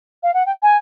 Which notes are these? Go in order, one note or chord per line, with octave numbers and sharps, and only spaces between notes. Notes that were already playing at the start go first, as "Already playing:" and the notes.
F5
F#5
G5
G#5